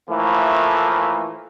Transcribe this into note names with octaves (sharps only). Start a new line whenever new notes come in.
A2 E3 F3 A3 A#3